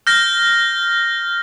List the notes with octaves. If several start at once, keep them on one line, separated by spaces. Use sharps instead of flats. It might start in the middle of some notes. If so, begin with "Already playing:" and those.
F6 G6 A#6